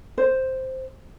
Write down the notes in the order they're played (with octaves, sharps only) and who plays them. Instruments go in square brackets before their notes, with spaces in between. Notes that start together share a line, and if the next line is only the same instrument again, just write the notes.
[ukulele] C5